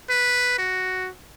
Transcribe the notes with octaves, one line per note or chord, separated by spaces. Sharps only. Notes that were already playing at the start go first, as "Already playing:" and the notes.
B4
F#4